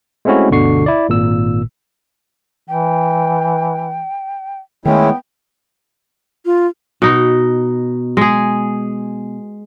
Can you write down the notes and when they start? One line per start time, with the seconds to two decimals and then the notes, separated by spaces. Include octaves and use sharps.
0.25 G#3 A3 C4 C#4 E4 F#4
0.50 G1 D2 B2 D3 C#6 C7
0.86 E4 D5
1.09 G#1 A#2 E6
2.68 E3 G5
4.85 D#3 G#3 A3 B3 C#4 E4 G5
6.45 F4
7.02 B2 D#4
8.17 G#3 G#4